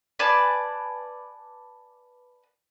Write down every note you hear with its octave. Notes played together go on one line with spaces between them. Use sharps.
B4 D5 G#5 A5